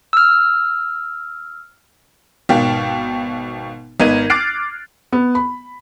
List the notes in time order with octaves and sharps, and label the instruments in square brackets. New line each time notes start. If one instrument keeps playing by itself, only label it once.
[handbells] E6 F6
[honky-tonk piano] G#1 B2 F5 G5
G#1 B3 A#4 D#5 G#6 D#7
D6 F6 F#6 A6 C7 D7
[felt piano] B3
B5